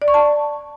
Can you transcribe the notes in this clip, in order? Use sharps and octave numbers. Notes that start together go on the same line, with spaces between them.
D5
C#6
A5